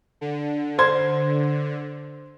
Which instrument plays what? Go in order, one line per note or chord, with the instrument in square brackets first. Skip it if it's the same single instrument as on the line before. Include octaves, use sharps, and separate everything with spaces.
[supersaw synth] D3
[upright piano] C5 C6 G#6